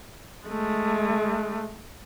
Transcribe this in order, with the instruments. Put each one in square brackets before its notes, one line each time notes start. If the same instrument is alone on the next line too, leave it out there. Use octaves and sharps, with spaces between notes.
[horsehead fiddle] G#3 A3